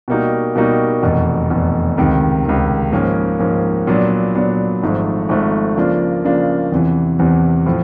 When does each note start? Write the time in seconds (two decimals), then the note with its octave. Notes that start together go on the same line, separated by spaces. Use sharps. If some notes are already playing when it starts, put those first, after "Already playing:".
0.08 B2 G3 A#3 D#4 F#4
0.55 B2 G3 A#3 D#4 F#4
1.03 F1 E2 B2
1.50 F1 E2 B2
1.97 C#2 C3 D#3
2.45 C#2 C3 D#3
2.92 G#2 F3 A#3 C#4
3.40 G#2 F3 A#3 C#4
3.87 A#2 F#3 B3 D4
4.35 A#2 F#3 B3 D4
4.83 G#1 G#2 F3 A3
5.29 G#1 G#2 F3 A3
5.77 C#3 F3 A#3 D4 F4
6.24 C#3 F3 A#3 D4 F4
6.72 E2 C3 E3
7.19 E2 C3 E3
7.66 A2 F3